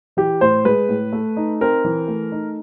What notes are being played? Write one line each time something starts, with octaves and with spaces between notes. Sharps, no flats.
E3 G4
A2 C5
G#3 B4
A2
A3
D#4
C4 A#4
E3
A3
D#4